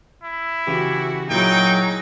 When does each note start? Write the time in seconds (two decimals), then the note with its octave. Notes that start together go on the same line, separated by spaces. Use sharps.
0.24 E4
0.67 C#3 E3 F#4 G4
1.30 A#2 F#3 D#4 E4 G#4 G5 D7